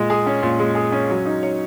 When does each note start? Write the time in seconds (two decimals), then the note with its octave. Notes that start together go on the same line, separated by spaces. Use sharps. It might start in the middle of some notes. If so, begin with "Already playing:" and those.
Already playing: A#2 G#3
0.10 G#4
0.26 C#4
0.43 A#2
0.60 G#3
0.75 G#4
0.92 C#4
1.10 F#3
1.26 D#4
1.43 C#5